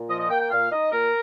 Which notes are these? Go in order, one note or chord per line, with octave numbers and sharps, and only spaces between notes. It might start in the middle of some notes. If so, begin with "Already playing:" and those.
Already playing: A#2
F3 D#5
D#5
A#3 G5
G5
A#2 F5
D#4 D#5
A#2 A#4